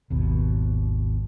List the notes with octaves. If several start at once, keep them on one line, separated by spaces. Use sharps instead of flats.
G#1 D#2 B2